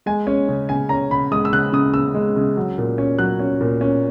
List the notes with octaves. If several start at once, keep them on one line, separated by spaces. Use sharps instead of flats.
G#3 G#5
C#4
C#3
C#3 G#5
C#4 A#5
C#3 B5
G#3 D#6
E6
C#3 F#6
C#3 D#6
C#3 E6
G#3
C#3
F#3
A#2
C#4
F#3 F#6
C#4
A#2
C#4